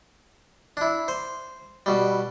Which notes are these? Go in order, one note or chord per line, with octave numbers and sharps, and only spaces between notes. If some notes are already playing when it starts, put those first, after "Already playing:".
D4 E4
C5
B2 G3